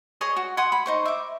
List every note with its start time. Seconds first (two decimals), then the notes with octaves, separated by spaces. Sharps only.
0.21 G#4 C#5 D#5
0.36 F#4
0.57 F#5 G#5 C6 D#6
0.72 B5
0.86 D#4 C5 C#6
1.05 E5 D6